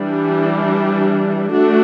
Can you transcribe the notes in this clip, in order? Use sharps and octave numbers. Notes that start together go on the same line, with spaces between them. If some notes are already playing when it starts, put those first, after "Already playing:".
Already playing: E3 G3 D4
A3 D4 F#4